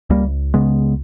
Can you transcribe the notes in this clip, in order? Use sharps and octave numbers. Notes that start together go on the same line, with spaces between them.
C#2 G3 A#3
C#3 G#3 B3